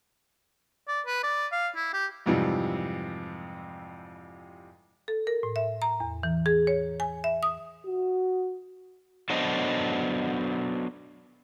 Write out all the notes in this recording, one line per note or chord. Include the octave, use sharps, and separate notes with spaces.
D5
B4
D5
F5
E4
G4
F2 G#2 C3 E3 F3 G3
A4
A#4
A2
E5
A#5
E2
E3
G#4
C#5
G#5
E5
D#6
F#4
F#3 B3 D4 A4 C5 D#5